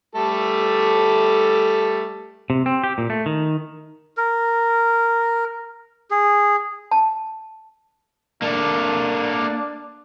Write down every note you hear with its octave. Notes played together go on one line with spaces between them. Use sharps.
G3 A3 A4
C3
C4
G4
A#2
A3
D#3
A#4
G#4
A5
A#3 D4 A4